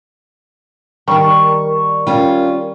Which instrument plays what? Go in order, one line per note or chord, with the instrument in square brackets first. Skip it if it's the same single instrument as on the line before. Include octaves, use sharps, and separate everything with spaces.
[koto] D#3 G3 [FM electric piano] A#4 D5 [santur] C#6
[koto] G3 [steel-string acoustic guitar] C#4 F4